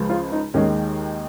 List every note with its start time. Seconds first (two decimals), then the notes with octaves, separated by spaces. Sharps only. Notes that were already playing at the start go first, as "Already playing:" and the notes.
Already playing: C#2 C#3 F3 G#3
0.10 F4
0.32 D#4
0.54 D#2 D#3 G#3 C#4